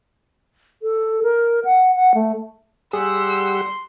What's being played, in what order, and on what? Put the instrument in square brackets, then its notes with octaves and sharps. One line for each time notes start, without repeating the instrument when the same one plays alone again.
[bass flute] A4
A#4
F#5
F#5
A3
[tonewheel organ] G3 G4 F#5 [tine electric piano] G#4 [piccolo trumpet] C6 [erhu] E6